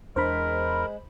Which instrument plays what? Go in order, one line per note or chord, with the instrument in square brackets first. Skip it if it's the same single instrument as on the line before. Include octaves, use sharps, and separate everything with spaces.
[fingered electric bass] E2 D4 [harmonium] G#3 [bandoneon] A#4 [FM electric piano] C5 B5